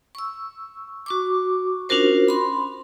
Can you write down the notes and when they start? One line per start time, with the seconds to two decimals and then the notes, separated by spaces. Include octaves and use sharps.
0.15 C#6 E6
1.06 F#4 C#6 D6
1.89 C#4 D4 F4 F#4 A#4 C5
2.28 B5 C6